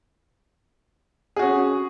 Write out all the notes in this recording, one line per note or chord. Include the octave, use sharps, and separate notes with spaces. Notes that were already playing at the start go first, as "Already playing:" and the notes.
C#4 F#4 G#4